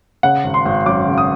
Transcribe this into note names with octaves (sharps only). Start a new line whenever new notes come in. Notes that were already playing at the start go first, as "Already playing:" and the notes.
C#3 F#5
G#1
C6
G#1
F#2 D6
C#3
D#6